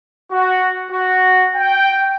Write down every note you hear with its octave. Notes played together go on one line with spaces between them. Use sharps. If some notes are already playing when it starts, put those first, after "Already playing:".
F#4
F#4
G5